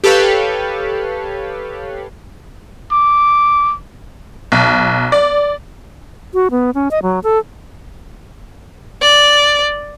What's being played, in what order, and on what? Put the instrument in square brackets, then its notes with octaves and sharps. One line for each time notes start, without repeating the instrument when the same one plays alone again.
[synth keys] G4 A4 B4 C#5 F5
[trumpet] D6
[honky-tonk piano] B1
D5
[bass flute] F#4
B3
C#4
D#5
F#3
A4
[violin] D5